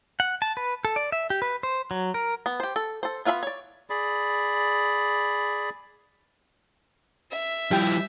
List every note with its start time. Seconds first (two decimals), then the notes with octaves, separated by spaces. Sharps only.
0.20 F#5
0.42 A5
0.57 B4
0.85 A4
0.96 D5
1.12 E5
1.30 G4
1.42 B4
1.63 C5
1.91 F#3
2.14 A#4
2.46 B3
2.60 G4 C5
2.76 A4
3.03 A4 C5
3.25 B3 F4 E5 F5 B5
3.43 C#5 D5
3.90 G#4 D5 B5
7.32 E5
7.71 F3 G3 E4 G5